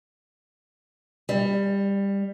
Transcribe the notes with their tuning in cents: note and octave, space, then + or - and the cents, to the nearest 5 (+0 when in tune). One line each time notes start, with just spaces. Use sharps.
G3 +20